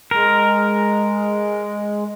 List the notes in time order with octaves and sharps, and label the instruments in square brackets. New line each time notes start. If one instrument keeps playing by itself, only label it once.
[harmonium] G#3 [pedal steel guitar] A#4